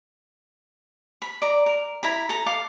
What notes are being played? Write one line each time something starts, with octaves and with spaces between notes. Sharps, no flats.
B5
D5 A#5
A#4
E4 A#5 B5
A4 A#5
A4 F5 D6